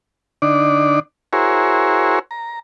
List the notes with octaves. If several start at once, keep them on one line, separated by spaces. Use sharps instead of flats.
D3 D4 D#4 D5
E4 F#4 G#4 A#4 C5 C#5
A#5